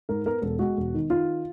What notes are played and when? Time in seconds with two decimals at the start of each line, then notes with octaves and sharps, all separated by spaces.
0.09 G#2 A#4
0.26 B3 A#4
0.42 E1 A4
0.59 G#3 F#4
0.77 E1
0.94 D#3
1.10 D#3 F4